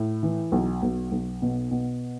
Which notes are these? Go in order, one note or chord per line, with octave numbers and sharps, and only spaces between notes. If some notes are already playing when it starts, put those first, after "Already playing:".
Already playing: A2
E3
B1
B1
B1
B2
B2